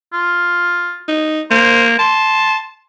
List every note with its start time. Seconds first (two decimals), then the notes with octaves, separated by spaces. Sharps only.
0.13 F4
1.08 D#4
1.51 A#3 C5
1.99 A5 C6